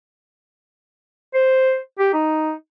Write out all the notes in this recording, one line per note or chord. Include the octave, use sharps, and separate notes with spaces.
C5
G4
D#4